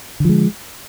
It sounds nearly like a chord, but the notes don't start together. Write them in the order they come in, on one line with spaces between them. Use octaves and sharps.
D3 F3 G#3